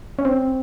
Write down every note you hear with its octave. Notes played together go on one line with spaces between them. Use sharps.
C#4
C4